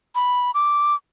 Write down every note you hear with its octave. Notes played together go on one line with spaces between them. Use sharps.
B5
D6